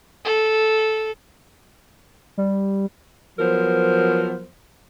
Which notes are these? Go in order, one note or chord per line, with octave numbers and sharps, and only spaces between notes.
A4
G3
F3 F#3 B3 A#4 C5